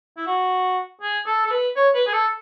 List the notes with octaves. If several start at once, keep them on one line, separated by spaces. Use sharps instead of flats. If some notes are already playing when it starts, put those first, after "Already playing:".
E4
F#4
G#4
A4
A4
B4
C#5
B4
G#4
A4